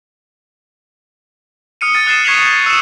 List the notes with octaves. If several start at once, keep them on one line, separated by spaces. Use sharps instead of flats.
D#6 F6 C#7 D#7
F6 A6 D#7
D#6 F#6 A6 C7 D#7 E7
C#6 G#6 B6 C7 F7 F#7
G6 C#7
E6 F6 C#7 E7